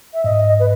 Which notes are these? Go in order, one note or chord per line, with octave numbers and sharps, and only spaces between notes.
E5
G#2 D#5
B4